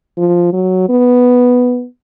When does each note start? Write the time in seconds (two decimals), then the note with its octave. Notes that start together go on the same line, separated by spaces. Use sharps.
0.17 F3
0.53 F#3
0.89 B3